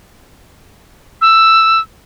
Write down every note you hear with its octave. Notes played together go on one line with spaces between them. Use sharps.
E6